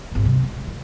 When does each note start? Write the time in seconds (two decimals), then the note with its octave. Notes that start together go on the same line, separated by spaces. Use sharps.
0.12 G#1 B2
0.24 C3 G3
0.44 G#3
0.67 D#3